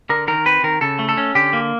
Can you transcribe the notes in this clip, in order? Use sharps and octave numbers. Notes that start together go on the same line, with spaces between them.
D3 A#4
D#3 A#4
C4 B4
D#3 A#4
C#3 A4
A3
A4
C#4
D3 G4
A#3